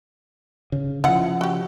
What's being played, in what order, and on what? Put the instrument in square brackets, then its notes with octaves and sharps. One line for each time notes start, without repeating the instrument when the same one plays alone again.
[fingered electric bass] C#3
[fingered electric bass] C#3 F3 [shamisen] E4 F#5
[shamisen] F#4 G4